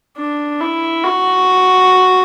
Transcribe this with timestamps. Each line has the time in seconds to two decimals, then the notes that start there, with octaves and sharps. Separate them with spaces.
0.17 D4
0.61 E4
1.04 F#4